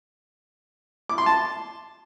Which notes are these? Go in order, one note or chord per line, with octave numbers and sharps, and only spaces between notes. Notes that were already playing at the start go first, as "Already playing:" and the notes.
D6
C6
A5